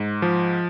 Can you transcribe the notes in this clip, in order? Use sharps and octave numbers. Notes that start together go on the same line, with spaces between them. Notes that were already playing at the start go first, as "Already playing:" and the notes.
Already playing: G#2
F3